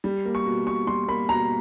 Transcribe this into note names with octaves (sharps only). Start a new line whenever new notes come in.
G3
A#3
C#6
B2
B2 C#6
G3 C6
A#3 B5
B2 A#5